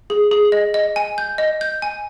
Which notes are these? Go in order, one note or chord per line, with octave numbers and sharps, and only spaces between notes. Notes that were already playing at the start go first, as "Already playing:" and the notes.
G#4
G#4
D#5
D#5
G#5
G6
D#5
G6
G#5